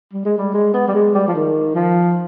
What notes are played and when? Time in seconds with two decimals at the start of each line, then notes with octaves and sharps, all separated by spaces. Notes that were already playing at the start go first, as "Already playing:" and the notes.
0.13 G3
0.25 G#3
0.38 G3
0.54 G#3
0.74 B3
0.88 G3
0.95 G#3
1.15 G3
1.28 F3
1.35 D#3
1.75 F3